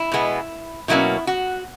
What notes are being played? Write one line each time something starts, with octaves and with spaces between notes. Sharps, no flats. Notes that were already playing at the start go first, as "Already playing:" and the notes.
Already playing: E4
B2 G#3 B3
B2 F#3 A#3 C#4 E4
F#4